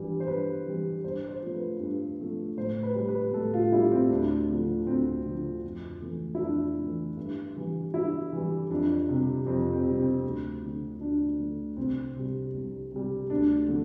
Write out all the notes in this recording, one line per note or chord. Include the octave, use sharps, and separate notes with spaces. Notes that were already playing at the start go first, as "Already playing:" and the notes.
Already playing: G2 E3 G3
C5
G2 B4
E3 G3
G2 C5
C5
F3 A3
B4
G2
F3 A3
A2 C5
B4
G3
B4
A2 A4
F4
G3 E4
C4
D2 D4
D3 F3 A3
D2 C4
D3 F3 A3
F2
E3 A3
E4
F2 D4
E3 A3
G2
E3 G3
G2 E4
E3 G3
F2 D4
C3 G3
F2 C4
C4
C3 G3
C4
D2
D3 A3
D2 D4
D3 A3
C2 C4
C3 G3
C2
C3 G3
D2 D4
D3 A3